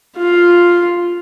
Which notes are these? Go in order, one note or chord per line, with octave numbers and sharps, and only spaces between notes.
F4